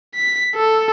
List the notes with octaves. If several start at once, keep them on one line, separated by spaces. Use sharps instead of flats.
B6
A4